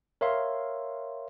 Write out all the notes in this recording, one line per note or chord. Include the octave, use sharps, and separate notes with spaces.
A#4 C#5 E5 F5 C6